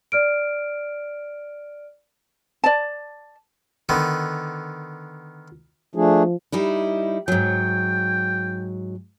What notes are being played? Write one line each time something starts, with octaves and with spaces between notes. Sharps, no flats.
D5 F6 D7
D5 A5
D3 D#3 B3
F3 A3 D4 G#4
G3 D#4 E4
G#2 F#3 G5